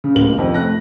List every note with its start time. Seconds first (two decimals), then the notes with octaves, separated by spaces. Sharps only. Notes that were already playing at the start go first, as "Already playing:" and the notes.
0.04 C#3
0.15 D1 C#2 A#3 F#7
0.38 F2 C3 D#3 F3
0.54 A3 F#6 A#6